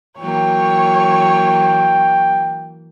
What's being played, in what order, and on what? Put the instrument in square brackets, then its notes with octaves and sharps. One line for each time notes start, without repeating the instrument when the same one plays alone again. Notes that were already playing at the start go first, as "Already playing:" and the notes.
[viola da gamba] E3 F#3 A#3 [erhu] C#5 [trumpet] G5